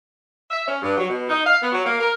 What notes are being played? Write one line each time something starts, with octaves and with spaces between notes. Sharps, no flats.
E5
C#4
G2
F#3
B2
D#4
F5
B3
F#3
A#3
A#4